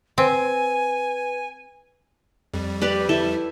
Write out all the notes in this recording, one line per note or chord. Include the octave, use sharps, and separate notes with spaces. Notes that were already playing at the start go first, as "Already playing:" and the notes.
C4 B4 G#5
F2 G3
G4 B4 D5
E4 A4